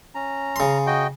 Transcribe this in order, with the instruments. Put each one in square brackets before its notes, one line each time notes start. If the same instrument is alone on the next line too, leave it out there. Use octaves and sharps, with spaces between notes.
[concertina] C#4 A#5
[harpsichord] C#3 C6
[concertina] F#4 D#5 G5